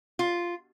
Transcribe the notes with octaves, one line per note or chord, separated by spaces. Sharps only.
F4